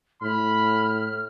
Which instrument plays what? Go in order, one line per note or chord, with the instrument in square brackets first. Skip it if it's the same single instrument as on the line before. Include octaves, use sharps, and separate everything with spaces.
[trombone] A2 [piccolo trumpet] B5 [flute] F6